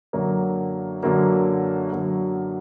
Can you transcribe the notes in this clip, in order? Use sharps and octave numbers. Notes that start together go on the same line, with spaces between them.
F#2 D3 F#3 A#3
F#2 D3 F#3 A#3
F#2 D3 F#3 A#3